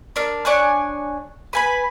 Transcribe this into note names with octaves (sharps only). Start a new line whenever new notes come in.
D4 A#4
D4 C#5 G#5 F#6
B4 G#5 B5